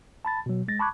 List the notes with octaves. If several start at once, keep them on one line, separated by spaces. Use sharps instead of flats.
A5 B5 A6
B2 F#3
G#3 A6 A#6
A5 B5 C#6 D6 F#6 G#6